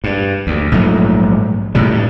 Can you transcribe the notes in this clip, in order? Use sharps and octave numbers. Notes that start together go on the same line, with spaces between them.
G2
D2
A#1 G#2 F#3 A3
A2 C3 G3
G2